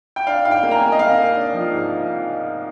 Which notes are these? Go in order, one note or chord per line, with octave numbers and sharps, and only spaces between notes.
G5
D4 F5
G#2 F5
G5
A#3
A#5
G#5
A#3
D#5
A#3 F5
A#3
D4
F3
G#2